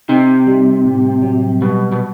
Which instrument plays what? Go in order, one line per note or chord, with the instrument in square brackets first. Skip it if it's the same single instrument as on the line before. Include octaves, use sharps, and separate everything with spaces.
[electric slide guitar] C3 [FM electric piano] D#4
[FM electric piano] G3
A2
F#3
[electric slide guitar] B2 [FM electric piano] G3
[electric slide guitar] B2